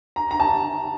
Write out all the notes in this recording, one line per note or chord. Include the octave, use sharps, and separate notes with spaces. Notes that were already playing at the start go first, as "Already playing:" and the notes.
A#5
A#5
A5